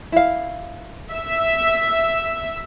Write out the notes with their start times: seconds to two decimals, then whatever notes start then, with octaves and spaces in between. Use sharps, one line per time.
0.12 E4 F5
1.12 E5